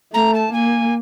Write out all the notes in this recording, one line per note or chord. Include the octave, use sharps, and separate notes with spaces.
A3 A#5
A5
A#3 G#5